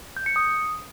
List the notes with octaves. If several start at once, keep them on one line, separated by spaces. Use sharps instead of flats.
G6
C#7
D#6